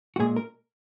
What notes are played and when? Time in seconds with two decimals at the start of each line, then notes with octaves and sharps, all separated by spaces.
0.16 F#4
0.20 A#2 G#3 G#4
0.36 A#4